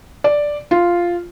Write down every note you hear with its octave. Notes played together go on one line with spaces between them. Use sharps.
D5
F4